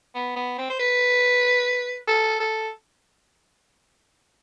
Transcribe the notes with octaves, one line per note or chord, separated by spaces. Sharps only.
B3
B3
C4
C5
B4
A4
A4